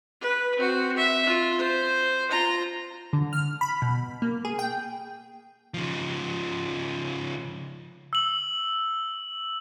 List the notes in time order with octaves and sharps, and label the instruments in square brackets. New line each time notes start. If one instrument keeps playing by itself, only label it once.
[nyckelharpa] B4
C4 F#4
E5
F4
C5
F4 A#5
[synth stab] D3
F6
B5
B2
A#3
G#4
G5
[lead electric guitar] C#3 F3
[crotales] E6 F#7